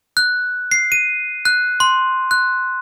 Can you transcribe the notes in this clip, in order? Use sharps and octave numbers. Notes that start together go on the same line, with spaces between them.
F#6
C7
D#7
F#6
C6
F#6